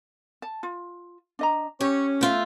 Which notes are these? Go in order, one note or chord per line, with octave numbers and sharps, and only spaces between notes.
A5
F4
D4 D#5 A#5
C#4 G4 C#5
A3 F4 E5